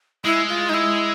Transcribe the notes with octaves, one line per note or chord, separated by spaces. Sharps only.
G#3 E4
F4
D#4
E4